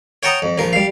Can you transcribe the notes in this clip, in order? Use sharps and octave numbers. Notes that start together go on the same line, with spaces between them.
C#5 F#5 G5 A5 A#5 D#6
F2
A#1 F3 A#4
G3 F5